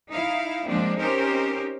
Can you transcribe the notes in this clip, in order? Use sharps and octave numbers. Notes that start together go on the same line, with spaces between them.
D#4 E4 F5
F3 G#3 A#3 C4 D4
C4 C#4 D#4 G4 A#4 C5